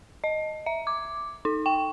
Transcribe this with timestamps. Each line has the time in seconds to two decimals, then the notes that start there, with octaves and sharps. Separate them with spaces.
0.24 D#5
0.66 E5
0.87 D6
1.45 D#4
1.66 G5